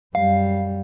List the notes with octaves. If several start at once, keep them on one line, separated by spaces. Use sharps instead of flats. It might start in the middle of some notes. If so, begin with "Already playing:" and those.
F#2 G3 F5